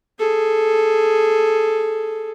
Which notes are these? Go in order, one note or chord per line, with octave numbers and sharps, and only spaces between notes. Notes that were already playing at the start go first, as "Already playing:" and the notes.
G#4 A4